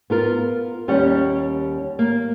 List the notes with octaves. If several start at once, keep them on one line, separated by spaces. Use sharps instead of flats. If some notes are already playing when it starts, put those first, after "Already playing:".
B3 F4 A#4
D#2 G3 C#4 F#5
A#3